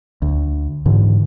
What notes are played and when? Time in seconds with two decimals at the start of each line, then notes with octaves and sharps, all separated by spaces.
0.22 D2
0.86 G#2 D3 E3